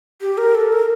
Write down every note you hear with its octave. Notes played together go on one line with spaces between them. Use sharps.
G4
A#4
A4
A#4